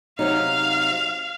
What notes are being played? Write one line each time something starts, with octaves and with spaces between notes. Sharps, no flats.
C3 F#3 D#4 F5